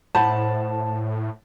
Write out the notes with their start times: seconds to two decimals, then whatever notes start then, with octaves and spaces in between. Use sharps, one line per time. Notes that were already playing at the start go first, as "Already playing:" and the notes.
0.15 A2 C5 F#5 A5 B5